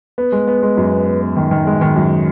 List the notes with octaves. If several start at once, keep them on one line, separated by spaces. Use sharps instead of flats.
B3
G#3
B3
G#3
F#2
B3
B3
B3
D#3
D#3
G#3
D#3
F#2